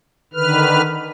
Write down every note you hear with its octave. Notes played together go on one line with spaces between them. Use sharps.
D3 D#3 B4 F6